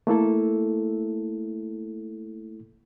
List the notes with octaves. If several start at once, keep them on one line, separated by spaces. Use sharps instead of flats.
A3 A#3 E4 A4